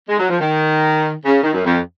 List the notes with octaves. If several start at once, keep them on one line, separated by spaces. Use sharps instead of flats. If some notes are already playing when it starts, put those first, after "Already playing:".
G#3
F#3
F3
D#3
C#3
D#3
F#2
F2